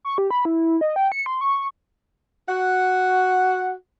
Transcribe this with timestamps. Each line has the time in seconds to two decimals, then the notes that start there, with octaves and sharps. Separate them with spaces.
0.05 C#6
0.18 G4
0.31 B5
0.45 E4
0.81 D#5
0.96 G5
1.12 C#7
1.26 C6
1.41 C#6
1.56 C#6
2.49 F#4 F#5